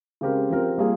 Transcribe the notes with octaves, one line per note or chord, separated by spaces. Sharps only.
C#3 G#3 C4 G4 A#4
F3 C4 G4 A#4
G3 A#3 F4 G#4